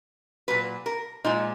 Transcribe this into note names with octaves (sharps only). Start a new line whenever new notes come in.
A#2 F#3 B4
A#4
A#2 F3 G#3 D#4